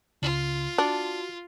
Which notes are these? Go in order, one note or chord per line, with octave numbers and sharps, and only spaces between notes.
C#2 C#3 F4
D4 F#4